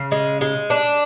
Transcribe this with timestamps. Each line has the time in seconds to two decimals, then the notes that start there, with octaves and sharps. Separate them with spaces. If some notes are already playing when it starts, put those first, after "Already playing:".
Already playing: C#3
0.12 G#3
0.41 G#3
0.70 D4